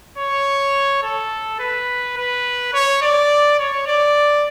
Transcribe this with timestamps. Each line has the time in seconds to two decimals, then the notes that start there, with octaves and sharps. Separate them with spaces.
0.18 C#5
1.03 A4
1.60 B4
2.17 B4
2.73 C#5
3.02 D5
3.59 C#5
3.87 D5